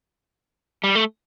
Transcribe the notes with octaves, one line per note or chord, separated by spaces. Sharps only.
G3
A3